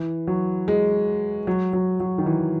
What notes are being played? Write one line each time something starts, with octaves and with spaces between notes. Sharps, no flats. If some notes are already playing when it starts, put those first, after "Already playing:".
Already playing: E3
F#3
G#3
F#3
F#3
F#3
D#3
E3